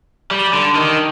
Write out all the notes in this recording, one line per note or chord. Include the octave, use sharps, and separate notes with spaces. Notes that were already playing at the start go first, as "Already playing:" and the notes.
G3
D3
D#3